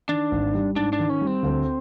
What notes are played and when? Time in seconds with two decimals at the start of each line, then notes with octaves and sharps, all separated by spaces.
0.09 D#3 D4
0.31 G#1
0.54 G3
0.76 G#2 D4
0.93 D4
0.99 D#3
1.10 C#4
1.21 G3
1.27 C4
1.43 D2